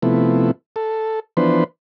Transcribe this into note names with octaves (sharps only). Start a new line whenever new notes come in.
C3 F3 A3 B3 E4
A4
E3 F3 B3 D4 B4 C5